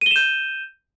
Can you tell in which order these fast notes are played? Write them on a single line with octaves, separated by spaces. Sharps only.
D#7 G7 E7 G6